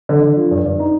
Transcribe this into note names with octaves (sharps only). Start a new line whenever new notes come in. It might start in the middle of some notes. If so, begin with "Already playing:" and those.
D3
D3
F3
G2
G2
D#4